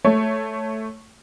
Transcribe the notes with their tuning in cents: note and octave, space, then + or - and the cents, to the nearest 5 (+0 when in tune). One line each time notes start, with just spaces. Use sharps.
A3 +0 C#5 +0